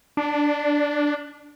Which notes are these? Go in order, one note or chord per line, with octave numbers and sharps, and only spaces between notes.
D4